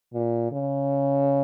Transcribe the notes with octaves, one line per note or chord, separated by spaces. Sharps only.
A#2
C#3